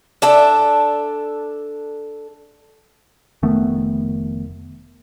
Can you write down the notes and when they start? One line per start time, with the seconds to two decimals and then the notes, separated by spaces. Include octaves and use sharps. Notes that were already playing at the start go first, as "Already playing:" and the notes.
0.22 D4 A4 E5
3.42 F1 D#3 A3 B3